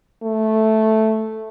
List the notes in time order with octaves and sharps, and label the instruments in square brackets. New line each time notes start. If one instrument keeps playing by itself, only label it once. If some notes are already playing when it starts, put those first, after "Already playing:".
[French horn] A3